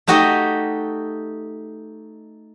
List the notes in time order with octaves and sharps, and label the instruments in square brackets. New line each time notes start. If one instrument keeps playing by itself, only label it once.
[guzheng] A3 D#4 F#4 G4 D#5